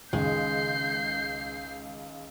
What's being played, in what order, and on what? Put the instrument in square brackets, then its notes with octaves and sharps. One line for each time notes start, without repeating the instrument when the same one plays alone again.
[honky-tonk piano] C#2 [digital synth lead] D#3 [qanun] G#3 [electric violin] G6 C7